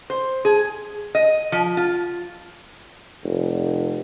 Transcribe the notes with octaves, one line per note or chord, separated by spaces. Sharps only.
C5
G#4
D#5
F3
F4
F1